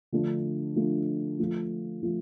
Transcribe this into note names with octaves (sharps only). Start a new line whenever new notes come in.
D3 F3 A3 D4 F4
D3 F3 A3 D4 F4
F3 A3 F4
F3 A3 F4